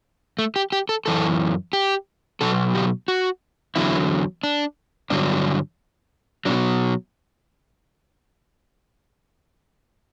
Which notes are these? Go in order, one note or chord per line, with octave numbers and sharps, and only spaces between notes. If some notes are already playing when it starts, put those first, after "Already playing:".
A3
G4
G4
A4
F#2 E3 A4
G4
B2 F#3 A4
G4
F#4
E2 D3 F#3 E4
D4
G2 D3 F#3 D4
B2 F#3 D4